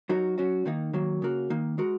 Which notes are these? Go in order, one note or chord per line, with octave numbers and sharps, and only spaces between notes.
F#3 D#4 F#4 A#4
F#3 C#4 F#4
D#3 A#3 D#4
D#3 F#3 A#3
C#3 A#3 F#4 A#4
D#3 A#3 D#4
G#3 F#4 A#4